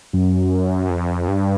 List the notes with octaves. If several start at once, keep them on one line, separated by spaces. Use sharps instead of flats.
F#2
F2
G2